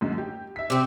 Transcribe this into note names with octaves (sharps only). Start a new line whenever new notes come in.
F#2 D3 G#3
G4
E5 B6
C3 C4